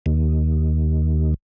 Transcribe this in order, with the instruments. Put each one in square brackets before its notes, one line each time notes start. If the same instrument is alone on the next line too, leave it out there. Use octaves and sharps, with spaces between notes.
[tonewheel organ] D#2